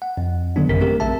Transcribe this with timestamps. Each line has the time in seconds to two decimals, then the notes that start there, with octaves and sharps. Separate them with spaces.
0.02 F#5
0.17 F2
0.56 D3 D#3 F#3 B3 D4
0.69 A1 F#2 C#3 A#4 B6
0.81 A3 C4 G4 A#4
1.00 A#1 E5 A5